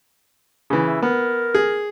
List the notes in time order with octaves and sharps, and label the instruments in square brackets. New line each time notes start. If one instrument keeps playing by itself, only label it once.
[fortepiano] C#3 E3
[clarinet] E5
[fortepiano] B3 [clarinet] A#4
[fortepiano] G#4